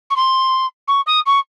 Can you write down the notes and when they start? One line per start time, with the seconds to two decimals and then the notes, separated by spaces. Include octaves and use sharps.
0.10 C#6
0.16 C6
0.87 C#6
1.06 D#6
1.26 C#6